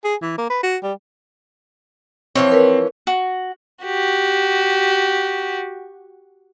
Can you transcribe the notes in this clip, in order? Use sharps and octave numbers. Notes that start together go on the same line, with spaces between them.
G#4
E3
A#3
B4
F#4
G3
E3 F3 C4 C#5
A#4 B4
F#4
F#4 G4